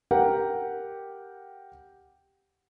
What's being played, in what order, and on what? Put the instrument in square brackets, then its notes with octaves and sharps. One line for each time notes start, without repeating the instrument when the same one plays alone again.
[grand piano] G4 A#4 F#5 G5